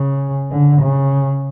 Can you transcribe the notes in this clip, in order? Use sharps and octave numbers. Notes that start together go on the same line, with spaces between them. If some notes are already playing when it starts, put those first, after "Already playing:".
Already playing: C#3
D3
C#3